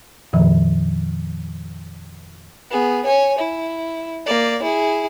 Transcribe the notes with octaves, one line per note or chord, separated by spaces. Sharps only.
F2 A#2 D#3 F3
B3 G#4
C#5 G#5
E4
A#3 D5
E4 G#4